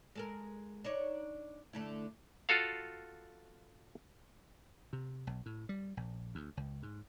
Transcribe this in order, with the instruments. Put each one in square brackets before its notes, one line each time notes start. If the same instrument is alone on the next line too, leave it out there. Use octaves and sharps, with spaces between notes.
[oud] G#3 A4 A#4
D4 D#4 C#5
D3 A3 E4
[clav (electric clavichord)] F4 F#4 A4 F5
[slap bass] C3
B1
A2
G3
A#1
D2
C#2
G#2